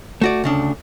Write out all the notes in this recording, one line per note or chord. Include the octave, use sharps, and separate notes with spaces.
A3 F#4 D5
D2 C#3 D4